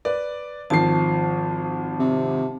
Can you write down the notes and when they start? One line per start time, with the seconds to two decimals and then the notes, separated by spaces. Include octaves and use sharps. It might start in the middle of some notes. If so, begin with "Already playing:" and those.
0.05 B4 D5
0.70 G#1 F3 A5 C7
1.99 C3